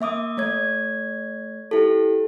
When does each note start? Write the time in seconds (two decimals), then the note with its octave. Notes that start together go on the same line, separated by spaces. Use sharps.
0.01 A#3 E5 D6 D#6
0.37 A3 C#5 G#6
1.71 E4 G4 A4